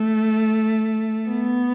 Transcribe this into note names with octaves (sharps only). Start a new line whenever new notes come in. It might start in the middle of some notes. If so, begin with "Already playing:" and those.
Already playing: A3
B3